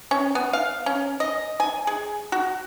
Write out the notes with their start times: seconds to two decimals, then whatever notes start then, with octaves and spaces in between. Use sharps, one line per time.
0.11 C#4
0.35 B3
0.53 F5
0.86 C#4
1.20 D#5
1.60 G#5
1.87 G#4
2.32 F#4